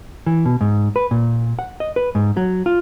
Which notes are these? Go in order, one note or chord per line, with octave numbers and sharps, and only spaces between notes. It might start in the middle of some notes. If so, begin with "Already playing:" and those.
E3
B2
G#2
B4
A#2
F#5
D#5
B4
G#2
F#3
F4